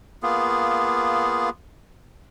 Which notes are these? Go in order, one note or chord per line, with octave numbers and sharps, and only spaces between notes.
A#3 B3 F4 G#4